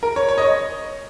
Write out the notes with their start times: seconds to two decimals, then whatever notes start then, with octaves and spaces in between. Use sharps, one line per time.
0.03 A#4
0.16 C#5
0.29 C#5
0.38 D#5
0.42 C#5